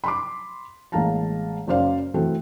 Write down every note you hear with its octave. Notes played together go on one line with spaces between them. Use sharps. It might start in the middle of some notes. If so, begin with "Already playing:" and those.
B5 C6 D6
A1 G#3 A#3 F5 A5 A#5
F#1 F#2 C#4 C5 D5 F5
E3 A3 C4 F#4 A4